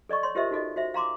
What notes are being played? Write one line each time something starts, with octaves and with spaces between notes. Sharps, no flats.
A4 D5 D#5 C#6
C#5 C6
F4 G4 A#4 C5 D#5 E5
D#4 F#4 A4 D#5
F#4 C5 E5
F5 A#5 C6 D6